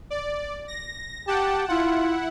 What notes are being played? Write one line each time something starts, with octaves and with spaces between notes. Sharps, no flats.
D5
A#6
G4 F#5 G5 A5
E4 F4 F#5